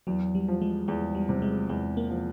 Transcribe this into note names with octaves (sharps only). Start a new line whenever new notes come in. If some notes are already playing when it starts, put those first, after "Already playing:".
E2 F#3
G3
F3
G#3
E2 G#3
G3
C3
G#3
E2 G#3
A#3
F3